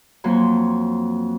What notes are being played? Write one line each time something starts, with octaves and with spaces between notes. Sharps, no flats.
F2 F#3 A#3 C#5 C6